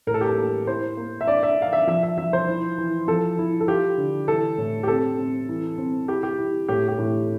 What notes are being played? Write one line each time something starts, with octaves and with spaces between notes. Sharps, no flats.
A2 A#4
A4
G4
A4
A#3
E4 C5
A#3
E5
D4 D5
E5
D4 F5
E5
F3 E5
E5
F3 E5
C5
E4
E3
F3 A4
E4
A4
F4 G4
D3
E3 A4
A2
G4
C4 A4
C4
E3
C4
E4 G4
G4
E4
A2 G4
G4
A2